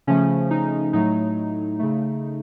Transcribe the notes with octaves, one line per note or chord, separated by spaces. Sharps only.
C#3 F3 A3 C#4
D#4
A2 F#3 A3 D#4
C#3 A3